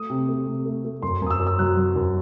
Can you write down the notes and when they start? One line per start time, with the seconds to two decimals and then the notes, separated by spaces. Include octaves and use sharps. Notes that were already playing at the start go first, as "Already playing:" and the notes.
Already playing: A3 D#6
0.10 C3
0.28 A3
0.47 C3
0.66 A3
0.85 A3
1.02 F#2 C6
1.22 F#2 D#6
1.31 E6
1.40 F#2
1.47 E6
1.59 F#3 F#6
1.77 F#3
1.96 F#2